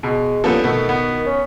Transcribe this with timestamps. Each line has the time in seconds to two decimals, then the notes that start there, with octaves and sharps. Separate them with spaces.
0.03 B2 G#3
0.44 G2 F3 A#3 B3 C#4 A4
0.64 B2 D#3 A3 B3
0.89 B3
1.26 C#4